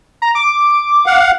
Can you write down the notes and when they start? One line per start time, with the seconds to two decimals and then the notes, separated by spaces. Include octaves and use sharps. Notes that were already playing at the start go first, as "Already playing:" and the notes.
0.22 A#5
0.35 D6
1.06 F5 F#5